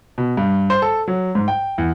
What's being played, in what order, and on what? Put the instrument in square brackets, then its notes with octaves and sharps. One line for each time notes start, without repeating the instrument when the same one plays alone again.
[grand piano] B2
G2
C5
A4
F#3
G#2
G5
E2